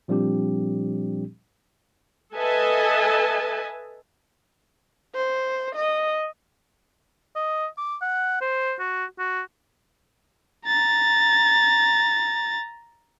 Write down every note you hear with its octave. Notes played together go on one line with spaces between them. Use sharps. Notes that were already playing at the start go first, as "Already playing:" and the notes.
A#2 F3 G3 C4 D4 G4
A4 B4 D#5 E5 G#5 A5
C5
D#5
D#5
D6
F#5
C5
F#4
F#4
A#5 A6